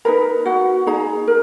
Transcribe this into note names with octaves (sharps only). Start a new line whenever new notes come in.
D#4 G#4 A#4 B4 A#5
F#4 F#5
D#4 G#4 A#5
A#4